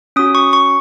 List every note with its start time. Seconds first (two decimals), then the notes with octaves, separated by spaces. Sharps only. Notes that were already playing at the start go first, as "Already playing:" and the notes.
0.16 C#4 F#4 D#6
0.35 C#6
0.53 C#6